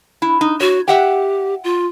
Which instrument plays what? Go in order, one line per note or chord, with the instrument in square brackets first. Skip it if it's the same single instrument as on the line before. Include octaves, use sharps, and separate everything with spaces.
[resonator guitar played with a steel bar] E4
D#4
[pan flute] F#4 [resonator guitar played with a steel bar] C#5
[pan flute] G4 [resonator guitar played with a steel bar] E5 F#5 G5
[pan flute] F4